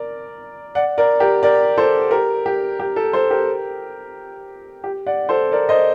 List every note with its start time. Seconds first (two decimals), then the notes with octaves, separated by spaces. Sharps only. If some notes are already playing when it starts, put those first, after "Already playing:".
Already playing: A#4 D5
0.75 D5 F#5
0.98 A#4 D5
1.20 G4 A#4
1.43 A#4 D5
1.78 A4 C5
2.11 G4 A#4
2.46 G4
2.80 G4
2.96 A4
3.13 A4 C5
3.31 G4 A#4
4.84 G4
5.06 D5 F#5
5.29 A4 C5
5.52 A#4 D5
5.69 C5 D#5